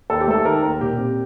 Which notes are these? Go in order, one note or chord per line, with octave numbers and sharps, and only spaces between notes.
D#2 A4
G4
A3 A4
D#3 A#4
D#2 A#4
A#2 G4
C4